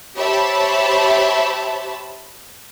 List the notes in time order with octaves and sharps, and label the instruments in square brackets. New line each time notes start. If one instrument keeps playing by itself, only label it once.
[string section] G4 C5 C#5 E5 A5 B5